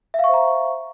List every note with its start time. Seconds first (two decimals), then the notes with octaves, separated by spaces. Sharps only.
0.14 E5
0.19 F5
0.24 C#6
0.29 C5
0.34 A#5